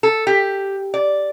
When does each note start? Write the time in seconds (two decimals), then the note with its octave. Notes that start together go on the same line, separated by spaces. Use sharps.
0.03 A4
0.27 G4
0.94 D5